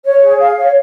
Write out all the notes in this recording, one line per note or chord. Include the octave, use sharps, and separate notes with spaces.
C#5
G#4
F5
C#5